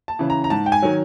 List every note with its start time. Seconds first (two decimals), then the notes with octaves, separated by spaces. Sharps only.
0.08 A5
0.19 C#3 E3
0.30 A#5
0.44 A#5
0.50 G#2 A5
0.66 G5
0.72 G#5
0.82 D#3 F#3